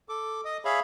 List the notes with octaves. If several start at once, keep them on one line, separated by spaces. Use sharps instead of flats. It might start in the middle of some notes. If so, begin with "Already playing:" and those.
A4 D6
D#5 D#6
G#4 C#5 E5 F5 B5